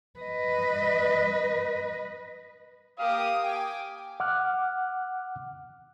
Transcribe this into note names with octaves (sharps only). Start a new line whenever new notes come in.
B4 D#5
A#3 G4 A#4 F5 D#6
G5 G#5 D6
F#5 D6 F6 F#6